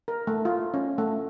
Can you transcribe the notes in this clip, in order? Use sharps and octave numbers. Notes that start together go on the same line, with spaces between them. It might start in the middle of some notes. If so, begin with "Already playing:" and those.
A#4
A3
F4
C#4
A3